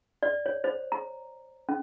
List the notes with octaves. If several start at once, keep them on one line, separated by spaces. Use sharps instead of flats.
D5
C#5
C5
A#5
C#4